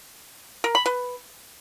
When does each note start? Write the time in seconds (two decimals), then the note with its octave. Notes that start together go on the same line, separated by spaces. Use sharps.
0.64 A#4
0.75 B5
0.86 B4